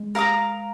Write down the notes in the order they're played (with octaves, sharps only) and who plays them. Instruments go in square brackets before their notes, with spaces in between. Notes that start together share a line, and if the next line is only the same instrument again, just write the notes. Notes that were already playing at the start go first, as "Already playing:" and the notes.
Already playing: [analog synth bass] G#3
[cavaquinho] A#4 F5 A#5 D#6